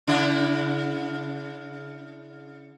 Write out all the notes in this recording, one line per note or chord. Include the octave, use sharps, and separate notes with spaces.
C#3 D4 E4